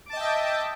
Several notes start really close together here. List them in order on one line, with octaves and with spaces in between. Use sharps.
D6 A5 D#5 G5 E5